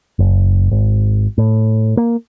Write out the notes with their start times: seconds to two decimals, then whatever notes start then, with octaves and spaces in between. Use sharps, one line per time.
0.19 F#1
0.71 G#1
1.38 A2
1.97 A#3